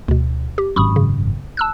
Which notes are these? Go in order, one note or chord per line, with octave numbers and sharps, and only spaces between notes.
D2 B2
G4
G#1 F#2 B5 C#6 D#6
C#3
A5 E6 F#6